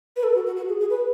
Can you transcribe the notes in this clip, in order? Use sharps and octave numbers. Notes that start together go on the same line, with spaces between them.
B4
A4
F#4
F#4
F#4
G#4
G#4
B4